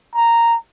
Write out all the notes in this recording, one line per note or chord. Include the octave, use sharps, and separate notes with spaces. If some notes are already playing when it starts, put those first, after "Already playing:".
A#5